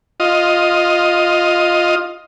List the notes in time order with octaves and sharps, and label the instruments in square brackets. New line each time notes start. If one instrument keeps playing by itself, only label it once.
[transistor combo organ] F4 D#5